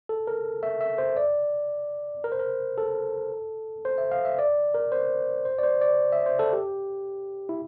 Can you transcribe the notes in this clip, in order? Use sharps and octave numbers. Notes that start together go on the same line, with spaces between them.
A4
A#4
E5
E5
C5
D5
A#4
C5
A#4
A4
C5
E5
F5
E5
D5
A#4
C5
C5
D5
C5
D5
E5
C5
A4
G4
E4